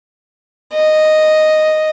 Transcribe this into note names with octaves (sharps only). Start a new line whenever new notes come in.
D#5